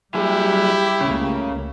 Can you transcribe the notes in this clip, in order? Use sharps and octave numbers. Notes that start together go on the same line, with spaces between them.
F#3 G3 E4 G4 G#4
C#2 C#3 A3 A#3